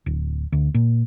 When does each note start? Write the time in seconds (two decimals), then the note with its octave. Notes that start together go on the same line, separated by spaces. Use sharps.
0.06 D1
0.52 D2
0.74 A#2